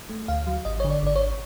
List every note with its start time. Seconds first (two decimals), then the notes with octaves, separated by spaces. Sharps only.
0.09 A3
0.28 D2 F5
0.47 F#3
0.65 G#1 D#5
0.80 D3 C#5
0.90 D5
1.03 G#1 D5
1.16 C#5